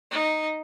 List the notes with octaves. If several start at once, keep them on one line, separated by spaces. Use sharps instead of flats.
D#4